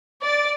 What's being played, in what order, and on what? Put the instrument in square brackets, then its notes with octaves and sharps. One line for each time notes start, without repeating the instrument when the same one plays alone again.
[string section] D5